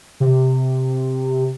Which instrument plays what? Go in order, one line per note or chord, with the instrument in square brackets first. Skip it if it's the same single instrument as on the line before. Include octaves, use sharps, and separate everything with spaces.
[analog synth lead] C3